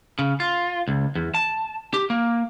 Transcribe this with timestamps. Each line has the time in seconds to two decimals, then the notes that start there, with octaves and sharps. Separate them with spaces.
0.19 C#3
0.40 F4
0.88 C#2
1.15 E2
1.34 A5
1.94 G4
2.10 A#3